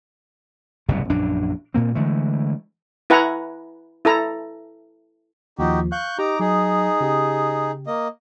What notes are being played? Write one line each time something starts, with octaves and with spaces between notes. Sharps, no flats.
F#1 C2 G#2 B2
A#1 F#2 D4
A#2 A#3 C4
D3 E3 G#3 A3
E4 B4 F#5 G#5 A#5
E4 A4 A#5
D#2 F3 D#4 F#4 G4
F5 C#6 F#6 G6
D#4 G4 A#5 D6
F#3 D#4 G#4
C#3 G4
A#3 D#5